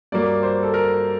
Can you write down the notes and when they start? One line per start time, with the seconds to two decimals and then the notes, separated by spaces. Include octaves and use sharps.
0.12 G2 F#3 A#3 D5
0.43 C5
0.63 A4
0.74 A#4